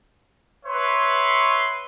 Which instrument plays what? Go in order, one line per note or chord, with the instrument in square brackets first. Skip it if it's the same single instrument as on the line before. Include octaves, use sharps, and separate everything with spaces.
[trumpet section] B4 C#5 E5 C6